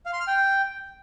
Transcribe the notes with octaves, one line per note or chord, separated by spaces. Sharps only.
F5
C6
F6
G5